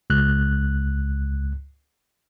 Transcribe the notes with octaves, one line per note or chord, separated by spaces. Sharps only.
C#2 F#6